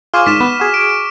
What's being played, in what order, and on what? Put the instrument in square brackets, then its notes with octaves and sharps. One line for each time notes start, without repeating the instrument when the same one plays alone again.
[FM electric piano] F4 G#4 C5 [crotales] C#6 D6 F6
[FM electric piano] G#2 D#3 D5 [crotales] B6 E7
[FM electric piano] B3
F#4 G#4
[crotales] D7